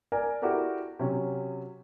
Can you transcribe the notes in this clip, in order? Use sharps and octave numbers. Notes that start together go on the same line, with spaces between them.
A#4 D5 G#5
E4 F#4 G4 A4 A#4 D5
C3 F#3 C#4